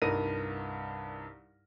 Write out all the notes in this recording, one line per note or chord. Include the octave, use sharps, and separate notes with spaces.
C2 G2 D#4 A#4 A#6 D#7